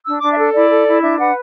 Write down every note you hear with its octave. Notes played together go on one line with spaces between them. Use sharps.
D4 E6
D4 D6
E5
A4
E4 D5
A4
E4
D4 E5
B4 F#5